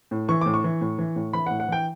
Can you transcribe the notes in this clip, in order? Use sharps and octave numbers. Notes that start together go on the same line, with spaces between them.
A2
E3 C#6
A2 D6
C#6
E3
A2
E3
A2
E3 B5
F#5
A2
F#5
E3 G5